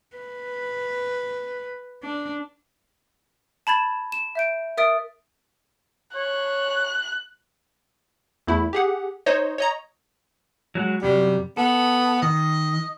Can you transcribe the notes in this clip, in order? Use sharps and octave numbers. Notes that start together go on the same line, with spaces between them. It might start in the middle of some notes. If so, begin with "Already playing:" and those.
B4
D4
A5 B5 G#6 A6 E7
E7
E5 G6 D7
A#4 E5 D#6 A6 D7
C#5 F#6
E2 A3 E4
G4 G#4 F#5
D#4 C5 C#5 D#5
C#5 D#5 A#5
F#3 G#3 F#4
F#2 C3 F#3 G3
B3 A4
D#3 D#5